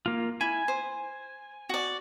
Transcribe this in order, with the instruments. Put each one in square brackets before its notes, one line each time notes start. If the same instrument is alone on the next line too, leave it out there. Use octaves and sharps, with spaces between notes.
[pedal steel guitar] A#3 F4
[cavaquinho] E4 [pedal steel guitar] G#5
[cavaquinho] C5
F#4 D5